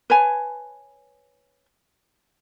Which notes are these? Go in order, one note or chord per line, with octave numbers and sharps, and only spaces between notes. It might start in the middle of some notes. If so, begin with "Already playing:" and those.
B4 C#5 G#5 A5